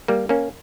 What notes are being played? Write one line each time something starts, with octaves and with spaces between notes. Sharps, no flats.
G3 A#3
A#3 C#4